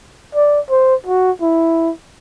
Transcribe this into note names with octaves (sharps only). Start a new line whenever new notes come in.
D5
C5
F#4
E4